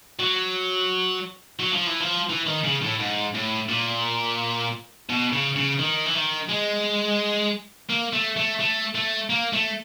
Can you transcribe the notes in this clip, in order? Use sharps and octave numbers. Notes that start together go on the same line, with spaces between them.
F#3
F#3
F3
E3
F3
E3
D#3
C#3
A2
G#2
A2
A#2
B2
C#3
C#3
D#3
E3
D#3
G#3
A#3
A3
A3
A3
A3
A#3
A3